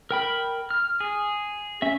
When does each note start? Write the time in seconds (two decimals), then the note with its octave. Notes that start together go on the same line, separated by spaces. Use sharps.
0.11 A#4 G5 B5
0.70 F6
1.00 G#4
1.82 C#4 E5